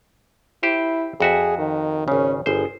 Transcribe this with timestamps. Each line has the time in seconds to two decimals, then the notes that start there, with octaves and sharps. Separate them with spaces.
0.63 E4 G4 C5
1.20 F2 F#4 G#4 E5
1.58 D#3
2.08 G#1 C#3 C#4
2.46 G1 G#4 C5